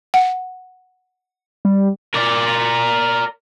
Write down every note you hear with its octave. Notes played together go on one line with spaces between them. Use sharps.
F#5
G3
A#4 D5